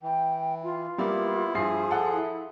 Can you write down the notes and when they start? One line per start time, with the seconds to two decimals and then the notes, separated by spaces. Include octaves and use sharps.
0.03 E3 G5
0.63 F4
0.98 G3 A#3 B3 E4
1.55 G2 F3 E4 G#4 C7
1.91 A4 F#5
2.13 E4